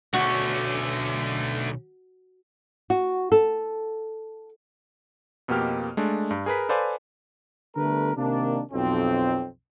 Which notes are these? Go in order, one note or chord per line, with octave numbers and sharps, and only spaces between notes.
B1 D3 A3 C#4 F#4
F#4
A4
F2 B2 A#3 G4 F6
G#3 A3 D4
G2
G#4 A#4 B4 B6
A4 B4 C5 D5 F5 G#5
D3 G3 A3 B3 A#4 B4
C3 D#3 A#3 D4
B1 F2 C4